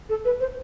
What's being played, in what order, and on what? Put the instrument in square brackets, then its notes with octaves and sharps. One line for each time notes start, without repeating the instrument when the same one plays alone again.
[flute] A4
B4
C5